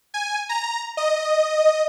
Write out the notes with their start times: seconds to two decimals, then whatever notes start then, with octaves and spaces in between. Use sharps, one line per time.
0.14 G#5
0.49 A#5
0.97 D#5